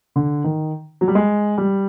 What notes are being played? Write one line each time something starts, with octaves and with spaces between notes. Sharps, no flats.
D3
D#3
F#3
G3
G#3
G3